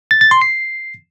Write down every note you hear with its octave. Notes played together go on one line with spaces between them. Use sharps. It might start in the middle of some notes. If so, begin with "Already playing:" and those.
A6
A6
C6
C7